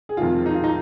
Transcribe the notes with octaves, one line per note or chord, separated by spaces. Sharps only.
G#4
F2 C3 D#3 G#3 F4
D#4
F4
D#4